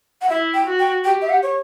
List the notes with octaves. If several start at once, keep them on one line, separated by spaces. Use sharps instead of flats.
F#5
E4 E5
G5
F#4
G5
G4 G5
E5
F#5
C#5